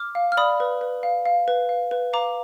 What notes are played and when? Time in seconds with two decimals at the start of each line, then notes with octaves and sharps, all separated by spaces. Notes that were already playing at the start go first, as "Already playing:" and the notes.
Already playing: D6 F6
0.15 F5
0.32 F6
0.37 D5 B5 D#6
0.60 B4
0.81 B4
1.03 F5
1.25 F5
1.48 B4
1.69 F5
1.91 B4
2.13 F5 A#5 D6